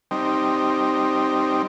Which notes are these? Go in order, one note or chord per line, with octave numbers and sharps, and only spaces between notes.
G3 C4 D#4